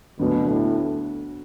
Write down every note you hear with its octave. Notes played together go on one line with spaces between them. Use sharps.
D2 B2 D3 F#3 B3
A2